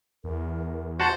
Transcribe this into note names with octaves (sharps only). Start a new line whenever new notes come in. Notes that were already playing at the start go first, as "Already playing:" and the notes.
E2 A#4
F#4 G#4 C5 F#5 A5